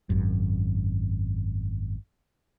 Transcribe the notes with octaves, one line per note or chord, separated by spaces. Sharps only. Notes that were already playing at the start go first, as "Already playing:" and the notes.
G#1 F#2